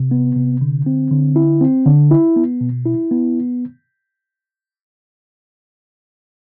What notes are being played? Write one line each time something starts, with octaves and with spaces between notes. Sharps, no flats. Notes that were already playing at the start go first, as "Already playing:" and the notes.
Already playing: C3
B3
C3
D3
C4
D3
E4
C4
D3
E4
B3
B2
E4
B3